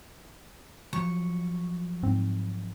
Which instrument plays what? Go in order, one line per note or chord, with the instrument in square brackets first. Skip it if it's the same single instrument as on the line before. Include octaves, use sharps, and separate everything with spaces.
[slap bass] F3 F#3 [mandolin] C#6
[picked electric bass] G#2 C4